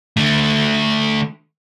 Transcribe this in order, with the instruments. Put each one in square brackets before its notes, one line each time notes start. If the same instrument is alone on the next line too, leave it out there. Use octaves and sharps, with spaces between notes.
[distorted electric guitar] D3 A3